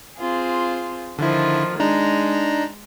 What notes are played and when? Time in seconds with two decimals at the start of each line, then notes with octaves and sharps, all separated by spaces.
0.17 C4 F4 G#4
1.19 D3 D#3 F3 E4 F4
1.80 G#3 D4 D#4 A#5